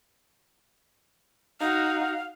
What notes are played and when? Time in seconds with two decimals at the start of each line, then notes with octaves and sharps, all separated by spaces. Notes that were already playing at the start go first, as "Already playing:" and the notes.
1.60 D#4 F#4 F5